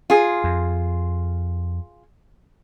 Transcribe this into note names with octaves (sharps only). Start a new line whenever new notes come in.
F4 G#4
F2